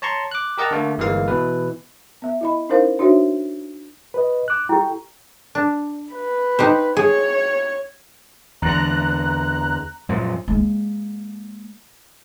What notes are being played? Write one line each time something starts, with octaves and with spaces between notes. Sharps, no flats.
C#5 A5 A#5 C6 C#6
D6 F#6
G4 A#4 D#5 F#5 A5 A#5
D3 A3 A#3
G1 E3 G#3 A#3 F5
B2 E3 B4
B3 E5
E4 D#5 B5
C#4 D#4 E4 A#4 C5 F5
D4 D#4 F#4 C5 C#5 E5
B4 D#5
D6 F#6
E4 G4 A4 G5
D4
B4
D#4 G4 C5
G#4 C#5
E2 D3 A#5 F#6
F#2 A#2 F3
G#3 A#3